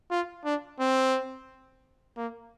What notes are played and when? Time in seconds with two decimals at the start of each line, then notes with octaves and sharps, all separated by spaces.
0.11 F4
0.45 D4
0.79 C4
2.17 A#3